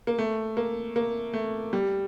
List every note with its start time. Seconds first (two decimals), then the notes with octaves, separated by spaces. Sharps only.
0.07 A#3
0.18 A3
0.57 A#3
0.96 A#3
1.33 A3
1.73 G3